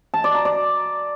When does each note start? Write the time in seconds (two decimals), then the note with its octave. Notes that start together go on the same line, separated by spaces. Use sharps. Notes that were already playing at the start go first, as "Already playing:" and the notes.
0.14 A5
0.24 D5
0.35 A#5
0.45 D5